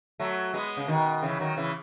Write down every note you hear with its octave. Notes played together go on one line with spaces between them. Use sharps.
F#3 A3
G#3 B3
C#3
B2 D#3
C#3 E3
D#3 F#3
C#3 E3